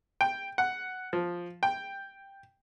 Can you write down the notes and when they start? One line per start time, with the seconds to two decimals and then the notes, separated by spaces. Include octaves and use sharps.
0.21 G5
0.58 F#5
1.13 F3
1.63 G5